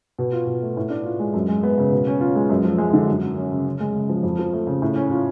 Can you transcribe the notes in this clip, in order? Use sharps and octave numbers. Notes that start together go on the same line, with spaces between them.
B2
F4
B2
A3
A2
D4
F4
G#3
F#2
G#3
B3
C#3
B2
C#4
F4
G#3
F#2
F3
G#3
D3
F#2
F#3
C#4
C#3
C#3
G#3
C#3
F3
F2
F3
A3
C#3
A2
C#4
F4